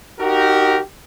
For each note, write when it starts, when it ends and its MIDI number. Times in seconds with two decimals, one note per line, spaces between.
0.19 0.80 63
0.19 0.80 66
0.19 0.80 67
0.19 0.80 70